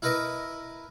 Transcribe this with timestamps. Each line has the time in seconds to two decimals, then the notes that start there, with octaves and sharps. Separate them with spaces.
0.02 E4 A#4 B4 D#5 E5